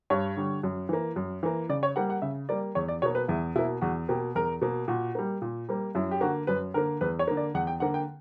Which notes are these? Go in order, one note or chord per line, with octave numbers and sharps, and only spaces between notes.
G2 C#5
D3 G3
F#2
E3 A#3
F#2
E3 A#3
C#3 D5
C#5
G3 A#3 F#5
F#5
C#3 E5
G3 A#3 D5
E2 C#5
D5
B2 A#3 C#5
B4
E2 E4
B2 A#3 E4
E2 F#4
B2 A#3 G4
E2 A#4
B2 A#3
A#2 F#4
G3 A#3
A#2
G3 A#3
F#2 E4
G4
D3 A#3 F#4
F#2 B4
D3 A#3 A#4
E2 B4
C#5
D3 A#3
D5
E2 F#5
G5
D3 A#3 F#5
G5